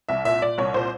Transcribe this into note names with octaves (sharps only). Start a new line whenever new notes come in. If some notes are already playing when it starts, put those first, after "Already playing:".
C2 E5
A#2 E5
A#2 D5
C2 C#5
A#2 C5